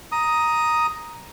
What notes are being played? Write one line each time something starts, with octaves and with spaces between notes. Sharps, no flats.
A#5 D#6